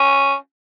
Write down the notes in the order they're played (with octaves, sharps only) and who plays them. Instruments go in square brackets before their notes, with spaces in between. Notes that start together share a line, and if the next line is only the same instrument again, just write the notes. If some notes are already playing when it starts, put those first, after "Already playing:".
Already playing: [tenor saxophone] C#4